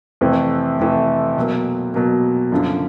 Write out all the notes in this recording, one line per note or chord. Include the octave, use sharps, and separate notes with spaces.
F2 C3 E3 A3
F2 C3 E3 A3
B2 F#3 A#3
B2 F#3 A#3
F#1 F#2 D3 F3